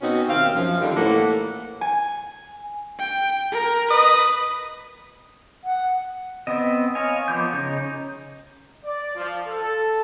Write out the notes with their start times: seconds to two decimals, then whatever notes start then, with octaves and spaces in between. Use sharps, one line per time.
0.01 B2 C4 C#4 D#4 F#4
0.28 D#2 C3 C4 F5
0.55 F#2 F3
0.80 D3 D#3 F3 G3
0.95 A2 E3 A#3 A4 F#5
1.81 G#5
2.99 G5
3.51 A#4
3.91 B4 D#5
5.64 F#5
6.47 B3 C4 D#5
6.95 C#5 D#5 F5 G#5
7.28 F3 B3 D6 G6
7.53 C#3 D#4 C#5 G6
8.85 D5
9.16 F3
9.48 A4